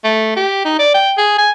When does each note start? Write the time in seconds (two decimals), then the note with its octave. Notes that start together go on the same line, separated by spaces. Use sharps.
0.04 A3
0.36 G4
0.65 D#4
0.79 D5
0.94 G5
1.18 G#4
1.38 G#5